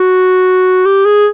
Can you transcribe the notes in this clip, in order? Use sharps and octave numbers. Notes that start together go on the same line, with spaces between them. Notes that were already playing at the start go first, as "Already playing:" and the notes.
Already playing: F#4
G4
G#4